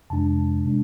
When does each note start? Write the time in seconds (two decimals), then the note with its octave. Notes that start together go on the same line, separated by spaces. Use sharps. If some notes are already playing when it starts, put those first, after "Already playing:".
0.10 F2 C3 G#3 D4 A5
0.65 C3 G#3 D4